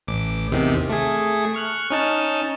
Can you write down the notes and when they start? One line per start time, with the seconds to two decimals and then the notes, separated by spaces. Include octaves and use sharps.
0.07 A1 D6
0.52 E2 C3 D#3
0.89 A3 G#4
1.54 C#6 F6 F#6
1.91 C#4 D#4 A5